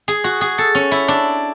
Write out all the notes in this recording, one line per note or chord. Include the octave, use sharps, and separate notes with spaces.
G#4
F#4
G#4
A4
C#4
E4
D4